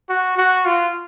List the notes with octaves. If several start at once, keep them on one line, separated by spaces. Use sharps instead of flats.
F#4
F#4
F4